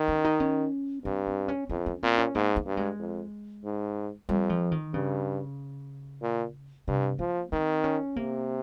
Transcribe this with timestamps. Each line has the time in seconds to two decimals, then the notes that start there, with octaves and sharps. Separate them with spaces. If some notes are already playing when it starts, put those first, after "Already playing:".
Already playing: D#3
0.08 C#4
0.25 D#4
0.40 C#4
1.05 G2 C4
1.27 C4
1.48 C#4
1.69 F2 C#4
1.86 C#4
2.03 A#2 C4
2.18 C#4
2.35 G#2 A#3
2.56 A#3
2.66 G2
2.77 G#3
2.99 F2
3.64 G#2
4.29 F2 G3
4.50 F3
4.71 D#3
4.94 G2 C#3
6.22 A#2
6.88 G2 C3
7.19 F3 A#3
7.52 D#3 C4
7.84 C#4
8.16 C3 A#3